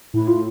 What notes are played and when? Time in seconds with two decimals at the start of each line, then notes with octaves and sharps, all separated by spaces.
0.14 A2 E4
0.28 F4